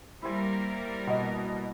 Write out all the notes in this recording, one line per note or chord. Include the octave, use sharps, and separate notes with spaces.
G3 A#3 E4 A#4 C5 G#5
B2 B3 D#5